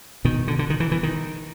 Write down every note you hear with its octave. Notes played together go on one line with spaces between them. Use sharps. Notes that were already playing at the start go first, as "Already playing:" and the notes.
B2 D#3
D3
D3
D#3
E3
E3
D#3